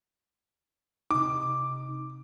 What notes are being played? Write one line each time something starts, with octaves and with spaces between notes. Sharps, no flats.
C3 D#4 D6